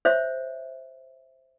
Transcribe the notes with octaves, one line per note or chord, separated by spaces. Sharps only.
C5 C#5 E5